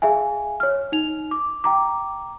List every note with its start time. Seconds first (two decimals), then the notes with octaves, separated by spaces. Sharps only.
0.02 G#4 E5 F5 G#5
0.60 C#5 F6
0.92 D#4 F7
1.31 D6
1.64 G5 A#5 D6